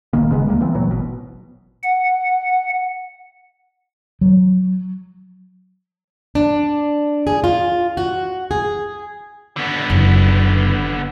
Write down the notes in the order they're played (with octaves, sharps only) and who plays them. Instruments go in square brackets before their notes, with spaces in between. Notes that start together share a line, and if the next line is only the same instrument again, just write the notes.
[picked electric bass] D#1 A1 D#3 A#3
D#1 C#3 G#3 B3
D2 G3 A#3
E3 B3 C4
A#2 E3 F#3 A3
G#1 B2
[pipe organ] F#5
[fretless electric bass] F#3
[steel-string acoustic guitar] D4
G#4
F4
F#4
G#4
[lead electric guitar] D3 B3
[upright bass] F#1 C#3